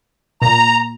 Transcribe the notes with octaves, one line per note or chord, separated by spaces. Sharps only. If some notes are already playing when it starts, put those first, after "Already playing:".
A#2 A#5